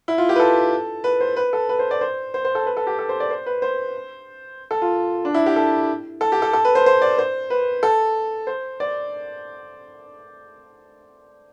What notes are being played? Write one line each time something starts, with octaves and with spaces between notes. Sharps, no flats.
E4
F4
G4
B4
A4
B4
C5
B4
A4
B4
C5
D5
C5
C5
C5
A4
B4
A4
G4
A4
C5
D5
C5
B4
C5
A4
F4
D4
E4
G4
A4
A4
G4
A4
A4
B4
C5
C5
D5
C5
B4
A4
C5
D5